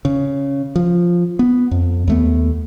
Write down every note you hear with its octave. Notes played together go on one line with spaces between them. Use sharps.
C#3
F3
B3
F2
D#2 A3 B3